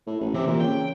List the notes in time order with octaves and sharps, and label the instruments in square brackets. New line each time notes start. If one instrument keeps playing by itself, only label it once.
[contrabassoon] A2
A1
[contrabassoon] C3 [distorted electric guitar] E3
[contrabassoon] A#2
[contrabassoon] C#3 [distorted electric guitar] G5